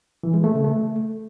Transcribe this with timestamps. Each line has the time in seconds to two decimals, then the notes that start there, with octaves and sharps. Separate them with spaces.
0.23 E3
0.34 G#3
0.44 A3
0.54 C#3
0.64 A3